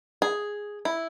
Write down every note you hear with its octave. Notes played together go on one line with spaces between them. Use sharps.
G#4
E4